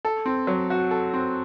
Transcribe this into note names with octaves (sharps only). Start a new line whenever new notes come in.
A4
C4
F#3
F#4
A4
C4